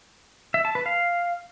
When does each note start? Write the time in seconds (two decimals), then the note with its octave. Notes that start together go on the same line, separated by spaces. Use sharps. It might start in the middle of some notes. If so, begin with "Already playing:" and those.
0.54 E5
0.65 A5
0.75 B4
0.86 F5